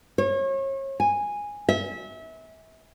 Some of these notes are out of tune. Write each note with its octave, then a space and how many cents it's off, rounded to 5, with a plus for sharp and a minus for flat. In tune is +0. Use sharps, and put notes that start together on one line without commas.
C#5 -35
G#5 -10
E5 -30